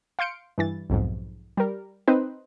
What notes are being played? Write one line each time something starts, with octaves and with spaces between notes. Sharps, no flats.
F5 C6 G6 C#7 D7
G2 E3 A6
B1 F2 G#2
G3 A#4
C4 D#4 B4 C5